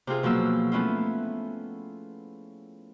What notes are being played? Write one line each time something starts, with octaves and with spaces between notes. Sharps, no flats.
C3 C4 F4 G#4
B2 F3 F#3 A#3 E6
A3 B3 C#4 E4 F4